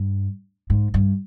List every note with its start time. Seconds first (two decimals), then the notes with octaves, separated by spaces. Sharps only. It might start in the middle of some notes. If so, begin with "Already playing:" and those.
Already playing: G2
0.70 G#2
0.94 G2